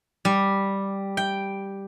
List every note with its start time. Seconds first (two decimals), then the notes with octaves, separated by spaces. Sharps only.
0.25 G3
1.17 G5